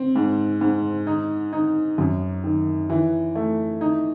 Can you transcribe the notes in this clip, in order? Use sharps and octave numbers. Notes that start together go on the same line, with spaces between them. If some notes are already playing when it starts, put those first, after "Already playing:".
Already playing: C4
G#2
G#2
D#4
D#4
F#2
D#3
E3
A3
D#4